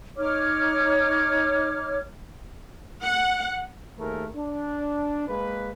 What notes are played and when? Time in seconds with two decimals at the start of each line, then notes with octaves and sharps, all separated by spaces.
0.17 D#4 C#5 D6 F6
3.02 F#5
3.99 D#2 A3 G#4 A#4
4.37 D4
5.28 G#3 A#3 B4